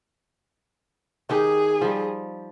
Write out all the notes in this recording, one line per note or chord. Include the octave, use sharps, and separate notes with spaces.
D#3 D#4 G4 G#4
F3 G3